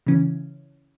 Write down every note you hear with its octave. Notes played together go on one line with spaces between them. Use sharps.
C#3 E3 C#4